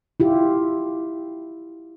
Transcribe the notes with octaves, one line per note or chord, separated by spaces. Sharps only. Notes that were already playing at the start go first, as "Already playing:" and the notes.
E4 F4 G4